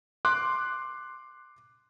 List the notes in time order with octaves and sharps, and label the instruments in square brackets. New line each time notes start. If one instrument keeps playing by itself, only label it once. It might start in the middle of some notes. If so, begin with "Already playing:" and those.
[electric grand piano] C6 D6 F#6